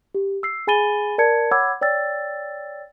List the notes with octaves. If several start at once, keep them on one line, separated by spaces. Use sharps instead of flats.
G4
E6 C7
G#4 G#5 B5 A6 D#7 G7
A#4 D5 A5 G#6 C#7
C#5 F#5 B5 D6 E6 G#6
C#5 D5 G5 E6 A6